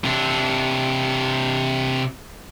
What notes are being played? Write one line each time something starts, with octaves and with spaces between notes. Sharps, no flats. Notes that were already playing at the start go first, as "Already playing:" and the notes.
C3 D4